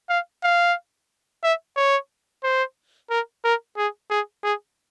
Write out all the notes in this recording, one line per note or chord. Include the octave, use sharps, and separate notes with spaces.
F5
F5
E5
C#5
C5
A#4
A#4
G#4
G#4
G#4